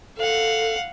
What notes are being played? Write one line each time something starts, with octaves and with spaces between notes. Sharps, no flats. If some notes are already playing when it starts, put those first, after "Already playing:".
A4 F5 F#5